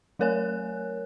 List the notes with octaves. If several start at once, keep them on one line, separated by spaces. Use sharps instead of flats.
F#3 A3 A#4 C#5 G#5 F#6